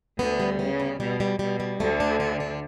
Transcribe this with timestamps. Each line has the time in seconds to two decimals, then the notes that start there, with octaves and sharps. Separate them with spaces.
0.19 D2 D3 B3
0.40 G3
0.59 C#3 B3
0.80 G3
1.00 B2 G3
1.20 G3
1.39 B2 G3
1.60 G3
1.80 D2 D3 A3
2.00 D4
2.20 D4
2.40 D4